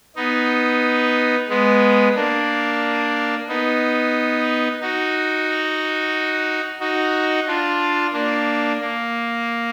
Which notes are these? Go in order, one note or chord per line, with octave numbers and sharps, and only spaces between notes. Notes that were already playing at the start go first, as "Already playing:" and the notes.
B3 D#4
G#3 B3
A#3 D4
B3 D#4
D#4 F#4
D#4 F#4
D4 F4
A#3 D4
A#3